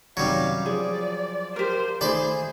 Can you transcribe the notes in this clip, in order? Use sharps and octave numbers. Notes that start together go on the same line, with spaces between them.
F#2 C3 D#3 F#3 G3 F5
F3 G#4 D5
G4 A#4 C5
D#3 A3 G#4 C5 D5 B5